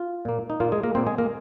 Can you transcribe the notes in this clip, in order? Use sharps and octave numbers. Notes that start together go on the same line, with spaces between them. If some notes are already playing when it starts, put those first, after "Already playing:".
Already playing: F4
A#2 A#3
D#4
A#2 A#3 F4
G#3 G#4
A#3 A#4
A#2 A#3 C4 C5
G#3 G#4
A#3 A#4